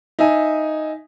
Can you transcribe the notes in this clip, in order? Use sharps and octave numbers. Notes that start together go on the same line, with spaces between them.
D#4 E5 G#5